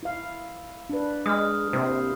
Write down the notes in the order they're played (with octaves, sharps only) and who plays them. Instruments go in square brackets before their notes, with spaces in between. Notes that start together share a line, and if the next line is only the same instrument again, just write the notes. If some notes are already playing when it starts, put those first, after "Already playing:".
[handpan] E4 F5
D4 B4
[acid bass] G#3 [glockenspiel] D#6 F6
[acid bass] C3 [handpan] A#3 E4 C5